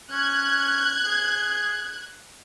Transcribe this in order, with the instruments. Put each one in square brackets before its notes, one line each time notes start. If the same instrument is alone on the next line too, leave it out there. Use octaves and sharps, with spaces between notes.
[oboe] C#4 [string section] F#6 G#6
[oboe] G#4